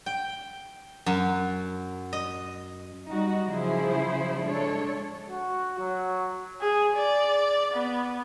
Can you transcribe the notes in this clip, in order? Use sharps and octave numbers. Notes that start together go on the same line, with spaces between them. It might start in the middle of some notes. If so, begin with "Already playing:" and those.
G5
F#2
D#5
G3 D#4 F#4
C#3 F3 F#3 E4 G#4 C5
G#3 D4 A4 C#5
F#4
F#3
G#4
D5
B3